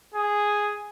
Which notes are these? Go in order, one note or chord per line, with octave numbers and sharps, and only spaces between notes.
G#4